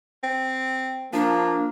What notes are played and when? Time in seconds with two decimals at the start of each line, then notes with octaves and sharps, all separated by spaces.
0.23 C4
1.13 F3 A#3 D4